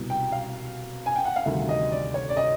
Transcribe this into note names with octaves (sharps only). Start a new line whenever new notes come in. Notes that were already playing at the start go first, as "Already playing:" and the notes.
Already playing: C2 B2 G3
G5
F5
G#5
G5
F#5
F5
D2 C3 D#3 G3 E5
D#5
D5
C#5
D5
D#5